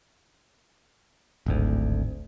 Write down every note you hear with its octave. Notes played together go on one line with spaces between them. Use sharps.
D1 G#1 D2